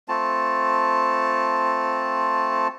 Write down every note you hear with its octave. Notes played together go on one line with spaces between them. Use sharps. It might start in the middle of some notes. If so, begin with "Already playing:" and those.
A3 C4 F4 A5